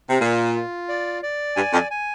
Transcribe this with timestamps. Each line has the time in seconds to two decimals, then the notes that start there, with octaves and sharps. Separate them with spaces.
0.10 C3
0.21 A#2 F4
0.55 F4
0.89 D5
1.23 D5
1.56 G2 G#5
1.73 F2
1.91 G#5